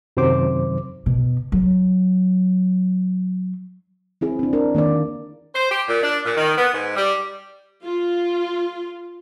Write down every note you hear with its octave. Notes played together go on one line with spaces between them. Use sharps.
F#2 C3 D#3 F#3 C5 D6
B2
F#3
C4 E4 G#4
C4 D4
D4 A#4
D#3 A#3 D4 D5
C5
G4
A#2
D4
A#2
D#3
B3
G#2
G3
F4